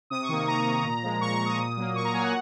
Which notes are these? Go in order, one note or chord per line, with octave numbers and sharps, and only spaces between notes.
C3 D#6
C#6
D#3 A#3
C3 A#5
D#3 A#3
A#2
F3 G#3
A#2 C#6
C#6
F3 G#3
D#6
A#2
F#3 A#3
A#2 C#6
A#5
F#3 A#3 G#5
F#5